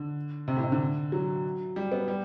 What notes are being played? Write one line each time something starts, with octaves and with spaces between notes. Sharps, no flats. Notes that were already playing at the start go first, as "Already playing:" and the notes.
Already playing: D3
C3
A2
C3
D3
F#3
G3
B3
G3